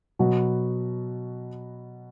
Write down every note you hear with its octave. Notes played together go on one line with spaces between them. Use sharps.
B2 F#3 B3 F#4